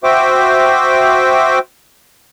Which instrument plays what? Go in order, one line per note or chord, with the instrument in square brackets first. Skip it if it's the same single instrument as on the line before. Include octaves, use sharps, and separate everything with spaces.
[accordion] F#4 C5 E5 G5 D6